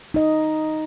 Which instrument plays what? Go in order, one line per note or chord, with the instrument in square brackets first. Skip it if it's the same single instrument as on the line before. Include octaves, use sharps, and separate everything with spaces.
[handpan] D#4 D#5